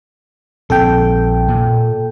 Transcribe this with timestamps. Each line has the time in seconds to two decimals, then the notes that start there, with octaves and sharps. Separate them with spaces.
0.70 A#1 C4 A4 G5
1.48 A#2